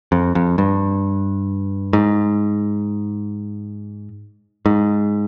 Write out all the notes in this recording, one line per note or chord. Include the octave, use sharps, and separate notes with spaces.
F2
F2
G2
G#2
G#2